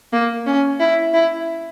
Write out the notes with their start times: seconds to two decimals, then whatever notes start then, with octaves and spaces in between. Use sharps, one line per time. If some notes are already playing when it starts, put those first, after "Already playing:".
0.12 A#3
0.46 C#4
0.80 E4
1.13 E4